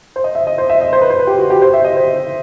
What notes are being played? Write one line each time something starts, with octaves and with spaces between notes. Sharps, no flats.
C5
D#5
E5
D#5
C5
E5
D#5
C5
B4
C5
B4
G4
F#4
G4
C5
E5
D#5
C5